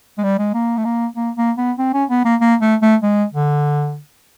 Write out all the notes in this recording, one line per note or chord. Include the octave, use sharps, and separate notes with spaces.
G#3
G3
G#3
A#3
A3
A#3
A#3
A#3
B3
C4
C#4
B3
A#3
A#3
A3
A3
G#3
D3